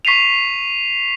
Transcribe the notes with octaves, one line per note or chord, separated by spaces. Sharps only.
C#6 B6 C7 D#7 F7